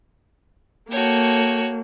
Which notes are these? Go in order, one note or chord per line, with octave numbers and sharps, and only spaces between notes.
A#3 F#4 A4 C#5 G5